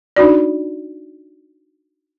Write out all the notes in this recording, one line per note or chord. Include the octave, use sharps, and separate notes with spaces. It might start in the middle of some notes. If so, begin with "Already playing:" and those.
D4 D#4 F#4 D5